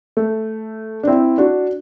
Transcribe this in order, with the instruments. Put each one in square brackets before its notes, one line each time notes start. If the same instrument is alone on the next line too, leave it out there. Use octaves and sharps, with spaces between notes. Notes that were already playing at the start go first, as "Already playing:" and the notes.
[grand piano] A3
D4
C4 E4
D4 F#4